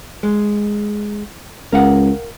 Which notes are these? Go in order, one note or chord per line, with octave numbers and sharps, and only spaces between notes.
G#3
C#2 A#4 F5 F#5